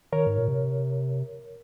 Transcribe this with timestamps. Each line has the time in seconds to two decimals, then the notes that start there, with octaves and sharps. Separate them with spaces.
0.13 D#3 A#4 C#5
0.27 G#2
0.37 A#2
0.48 C3